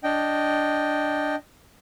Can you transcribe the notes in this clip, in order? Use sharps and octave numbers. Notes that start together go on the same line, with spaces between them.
D4 D#5 G5